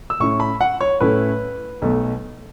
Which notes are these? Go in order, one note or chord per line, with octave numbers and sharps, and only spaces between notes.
E6
A2 A3 C#4 E4 C#6
B5
F#5
C#5
A2 A3 C#4 E4 B4
B1 B2 A3